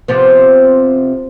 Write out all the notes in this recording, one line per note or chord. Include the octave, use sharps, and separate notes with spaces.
C3 F3 B3